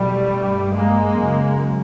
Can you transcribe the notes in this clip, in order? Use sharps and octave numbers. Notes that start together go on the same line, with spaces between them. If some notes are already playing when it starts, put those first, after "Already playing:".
Already playing: E2 B2 G3 A3
G2
G#3 A#3
F#2 C#3